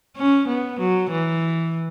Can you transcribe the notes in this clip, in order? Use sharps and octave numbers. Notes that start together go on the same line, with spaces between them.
C#4
B3
F#3
E3